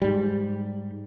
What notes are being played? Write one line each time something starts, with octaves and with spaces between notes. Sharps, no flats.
G#2 G3